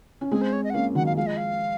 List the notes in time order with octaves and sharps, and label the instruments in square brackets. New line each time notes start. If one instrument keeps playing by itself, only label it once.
[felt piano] C#4
[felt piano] G#3 C4 [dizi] G#4
[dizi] C5
C#5
D#5
F#5
[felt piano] A#3 C#4 [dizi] F5
[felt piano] D#3 F#3 [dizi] F#5
[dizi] F5
[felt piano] F3 G#3 [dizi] F5
[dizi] D#5
F5